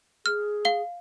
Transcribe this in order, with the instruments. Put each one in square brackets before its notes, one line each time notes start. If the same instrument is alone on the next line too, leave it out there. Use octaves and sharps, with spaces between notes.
[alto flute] G#4 [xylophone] F6
[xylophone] F5 G7